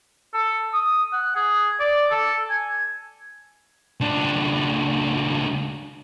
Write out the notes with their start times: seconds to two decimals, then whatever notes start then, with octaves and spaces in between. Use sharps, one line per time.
0.34 A4
0.73 D#6
1.13 F#5
1.35 G#4
1.80 D5
2.11 A4
2.50 G#5
4.00 C#2 D4